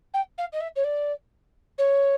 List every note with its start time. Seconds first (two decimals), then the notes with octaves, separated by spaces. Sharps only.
0.14 G5
0.38 F5
0.52 D#5
0.60 E5
0.76 C#5
0.84 D5
1.78 C#5